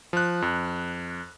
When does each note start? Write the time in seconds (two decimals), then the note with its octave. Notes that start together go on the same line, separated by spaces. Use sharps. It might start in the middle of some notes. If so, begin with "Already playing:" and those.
0.13 F3 F#6
0.42 F2